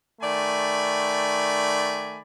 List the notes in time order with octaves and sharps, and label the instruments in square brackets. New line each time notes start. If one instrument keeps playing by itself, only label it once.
[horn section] D#3 A3 D5 G#5 B5